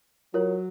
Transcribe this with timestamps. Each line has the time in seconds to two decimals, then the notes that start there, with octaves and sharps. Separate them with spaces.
0.34 F#3 F4 A#4 C#5